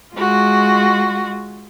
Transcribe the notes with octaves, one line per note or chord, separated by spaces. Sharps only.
G#3 F4 F#4